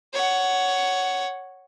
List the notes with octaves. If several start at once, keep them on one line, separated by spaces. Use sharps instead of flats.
C#5 F#5